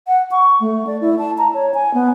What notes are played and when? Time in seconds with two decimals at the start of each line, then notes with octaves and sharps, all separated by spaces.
0.07 F#5
0.31 C#6
0.60 A3
0.87 D5
1.01 E4
1.19 A5
1.38 A#5
1.54 C#5
1.74 G#5
1.94 B3